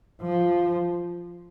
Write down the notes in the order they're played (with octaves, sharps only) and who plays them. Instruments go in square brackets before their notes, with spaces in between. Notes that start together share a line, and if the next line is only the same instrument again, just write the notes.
[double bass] F3